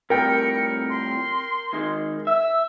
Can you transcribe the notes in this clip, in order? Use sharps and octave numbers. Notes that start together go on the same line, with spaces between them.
F2 A2 G3 A#4 G5 C#7
C6
D#3 G#3
E5 E6